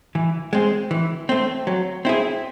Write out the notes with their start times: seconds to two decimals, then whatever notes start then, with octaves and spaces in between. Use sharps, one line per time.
0.15 E3
0.53 G#3 C4
0.91 E3
1.29 A3 C4
1.67 F#3
2.05 C4 E4 G#4